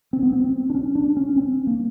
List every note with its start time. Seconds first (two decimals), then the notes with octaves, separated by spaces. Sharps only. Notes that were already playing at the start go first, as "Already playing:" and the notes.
0.13 C4
0.23 B3
0.33 C4
0.44 C4
0.70 D4
0.75 C#4
0.95 D4
1.17 C#4
1.36 C4
1.67 A#3